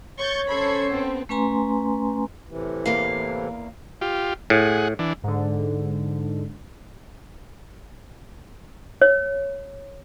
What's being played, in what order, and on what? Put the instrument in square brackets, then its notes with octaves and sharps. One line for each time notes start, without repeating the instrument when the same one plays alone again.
[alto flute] C#5 [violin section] C#6 G6 A6
[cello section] C#4 A4 C5 [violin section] B5 G#6 C#7
[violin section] B3 C4
[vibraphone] A3 C#4 B4 G#5 A#5 C6
[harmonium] A2 C3 E3
[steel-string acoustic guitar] E2 A#3 F5
[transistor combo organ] F4 G4
[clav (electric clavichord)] A2 [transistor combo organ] G#4 F#5
[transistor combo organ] E3 D4
[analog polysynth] G#2 D3
[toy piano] C#5